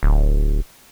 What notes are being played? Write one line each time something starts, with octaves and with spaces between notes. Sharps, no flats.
D1